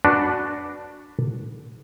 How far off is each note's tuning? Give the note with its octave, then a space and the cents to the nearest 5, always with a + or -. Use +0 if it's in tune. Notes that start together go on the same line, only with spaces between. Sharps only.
D4 +0 F#4 +0 B4 +0